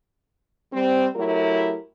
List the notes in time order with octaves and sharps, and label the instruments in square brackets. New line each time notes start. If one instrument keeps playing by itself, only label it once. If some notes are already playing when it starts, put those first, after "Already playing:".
[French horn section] G3 C4
F#3 A3 E4 G4 A#4